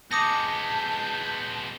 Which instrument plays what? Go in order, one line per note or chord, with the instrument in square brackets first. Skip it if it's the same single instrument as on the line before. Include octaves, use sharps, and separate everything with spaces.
[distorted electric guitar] G#3 B3 [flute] A5 [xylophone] D6 D#6 A#6 [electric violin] G6